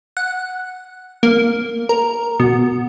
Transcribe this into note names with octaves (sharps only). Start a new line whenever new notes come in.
F#5
A#3
A#4
B2